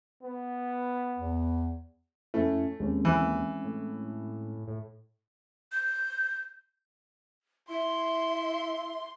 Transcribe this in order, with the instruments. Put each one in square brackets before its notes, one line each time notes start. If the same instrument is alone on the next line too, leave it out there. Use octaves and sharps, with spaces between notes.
[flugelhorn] B3
[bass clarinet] E2
[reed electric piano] F2 E4 [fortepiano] A3 [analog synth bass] C#4
[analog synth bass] D#2 [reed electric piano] G#3 C4 C#4
[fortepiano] E3
[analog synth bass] A2
A2
[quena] G6
[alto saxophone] E4 [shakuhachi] E5 [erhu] C6